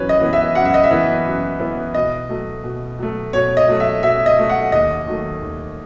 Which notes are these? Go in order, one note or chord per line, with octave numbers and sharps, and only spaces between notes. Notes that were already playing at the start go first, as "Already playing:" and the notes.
Already playing: F#2 E3 B3 F#4 B4 C#5
D#5
E3 B3
E5
F#2 F#5
E5
D#5
E5
E3 B3
F#2
E3 B3
B2 D#5
F#3 A3
B2
F#3 A3
B2 C#5
D#5
F#3 A3
E5
B2 E5
D#5
F#3 A3
F#5
D#2 D#5
D#3 F#3 A3
D#2